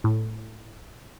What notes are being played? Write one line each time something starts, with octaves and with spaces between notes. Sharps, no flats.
A2